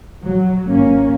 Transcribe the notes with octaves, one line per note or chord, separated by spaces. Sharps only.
F#3
G#1 A#3 C#4